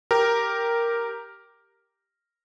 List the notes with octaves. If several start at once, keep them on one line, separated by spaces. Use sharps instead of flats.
G4 A#4